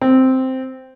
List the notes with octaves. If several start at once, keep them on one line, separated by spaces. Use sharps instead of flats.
C4